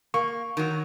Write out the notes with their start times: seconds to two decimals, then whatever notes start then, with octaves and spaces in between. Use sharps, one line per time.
0.14 A#3 C#6
0.57 D#3 F#3